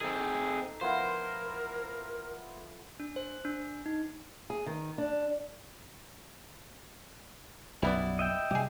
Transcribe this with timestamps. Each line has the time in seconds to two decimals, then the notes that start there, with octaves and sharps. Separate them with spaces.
0.01 C4 D#4 G#4 A4
0.81 F3 B3 E4 A#4 C5
3.00 D4
3.16 C5
3.45 D4
3.86 D#4
4.50 G#4
4.66 D#3
4.98 D4
7.83 B1 F#2 G3 B3 E4 D5
8.19 D#5 E5 G5
8.51 C3 G3 G4 G#4